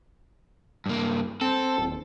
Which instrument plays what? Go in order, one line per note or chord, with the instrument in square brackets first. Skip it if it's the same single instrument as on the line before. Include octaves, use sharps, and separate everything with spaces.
[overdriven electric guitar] G2 A#3
[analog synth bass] C4 [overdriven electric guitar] A4
[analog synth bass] D#1